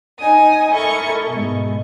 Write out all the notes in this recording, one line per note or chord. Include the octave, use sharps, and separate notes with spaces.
D#4 G#5 D#6
E4 A4 A#4 D#5 C#6
G#2 B2